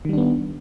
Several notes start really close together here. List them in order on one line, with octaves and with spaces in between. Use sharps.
D#3 G3 D4 B3